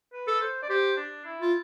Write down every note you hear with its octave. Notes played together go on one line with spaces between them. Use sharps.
B4
A4
C5
D5
G4 C5
D4
E4
F4